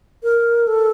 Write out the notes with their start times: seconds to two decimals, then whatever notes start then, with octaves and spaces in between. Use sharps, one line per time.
0.23 A#4
0.67 A4